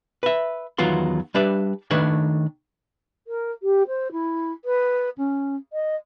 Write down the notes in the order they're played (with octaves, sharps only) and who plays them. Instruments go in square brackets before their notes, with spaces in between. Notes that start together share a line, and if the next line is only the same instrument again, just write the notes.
[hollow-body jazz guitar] B4 E5
E2 D#3 F#3 B3 F4 C6
G3 D4 B4 D5 E5
D#3 A3 D4 B4 C#5
[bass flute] A#4
G4
C5
E4
B4
C#4
D#5